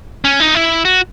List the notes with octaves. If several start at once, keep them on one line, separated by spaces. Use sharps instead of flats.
C#4
D#4
E4
F#4